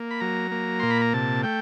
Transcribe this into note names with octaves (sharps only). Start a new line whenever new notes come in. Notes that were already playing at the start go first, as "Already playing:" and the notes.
Already playing: A#3
B5
F#3 A#5
A#3
A#2 C6
B5
A#5
C3 A5
A3 G5